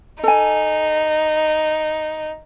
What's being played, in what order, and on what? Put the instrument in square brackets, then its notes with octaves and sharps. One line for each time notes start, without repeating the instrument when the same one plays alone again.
[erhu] D#4 [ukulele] A4 G#5